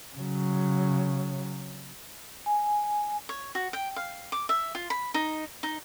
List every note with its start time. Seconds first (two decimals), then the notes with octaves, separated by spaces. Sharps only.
0.16 C#3 F#3
2.46 G#5
3.29 C#5
3.55 F#4
3.73 G5
3.96 F5
4.32 D6
4.49 E5
4.75 F4
4.90 B5
5.14 D#4
5.63 D#4